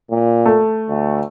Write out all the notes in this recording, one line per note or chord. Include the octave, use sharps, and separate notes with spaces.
A#2
A3
D2